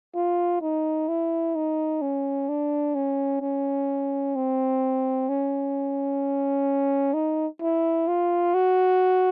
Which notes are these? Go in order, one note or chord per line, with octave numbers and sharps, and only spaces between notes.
F4
D#4
E4
D#4
C#4
D4
C#4
C#4
C4
C#4
D#4
E4
F4
F#4